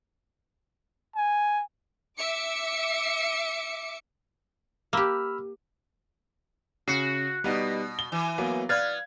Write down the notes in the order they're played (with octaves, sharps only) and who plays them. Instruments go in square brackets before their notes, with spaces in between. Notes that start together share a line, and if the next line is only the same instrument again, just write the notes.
[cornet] G#5
[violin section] E5 D6 C#7
[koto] A#3 G4 [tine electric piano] B5 E6 F6
[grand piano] C#3 [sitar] F#4 [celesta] C7 C#7
[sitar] B2 [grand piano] G3 B3 D#4
[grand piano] G7
[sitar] E3
[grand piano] F#3 A#3 B3
[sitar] B3 B4 [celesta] D5 F6 A6 [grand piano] F5 G#6